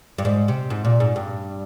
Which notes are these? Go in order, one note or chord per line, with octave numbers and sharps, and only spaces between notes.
G2
G#2
C3
G#2
A#2
G#2
G2